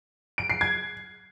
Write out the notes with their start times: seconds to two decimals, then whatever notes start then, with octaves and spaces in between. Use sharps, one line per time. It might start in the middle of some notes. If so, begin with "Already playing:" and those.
0.38 D7
0.50 C7
0.61 G#6